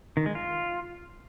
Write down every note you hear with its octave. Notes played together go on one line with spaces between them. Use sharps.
D#3
G#3
F4